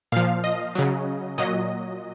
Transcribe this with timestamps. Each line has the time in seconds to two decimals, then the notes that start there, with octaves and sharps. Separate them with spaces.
0.12 A#2 F3 F5
0.44 D#5
0.75 C#3 F#3
1.38 A#2 F#3 D#5